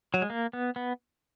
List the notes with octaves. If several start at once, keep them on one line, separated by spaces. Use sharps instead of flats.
F#3
G#3
A#3
B3
B3